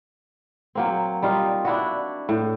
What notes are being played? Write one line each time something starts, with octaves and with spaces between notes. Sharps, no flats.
F#3 A#3 C4
G3 D#4 F4
D4 E4 F#4
A2